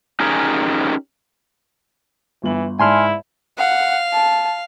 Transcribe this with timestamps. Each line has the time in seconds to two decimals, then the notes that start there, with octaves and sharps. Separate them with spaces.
0.20 C#4 D#4 G4 G#4 A#4
2.43 G1 E3 F#7
2.79 G#2 E4 D5 G#5 A5 C6 F6
3.58 F5 F#5
4.13 A5